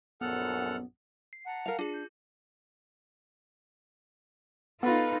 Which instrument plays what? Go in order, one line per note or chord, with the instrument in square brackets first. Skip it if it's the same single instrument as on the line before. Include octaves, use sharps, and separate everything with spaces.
[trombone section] A#1 F#2 [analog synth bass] B3 [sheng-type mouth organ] A4 F#5 F6
[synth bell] C7
[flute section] F#5 A5 A#5
[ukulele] A#4 F5 [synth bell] F7
[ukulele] D4 [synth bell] F4 G#4
[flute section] G6
[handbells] B3 [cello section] D#4 F4 A4 [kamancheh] B4 F5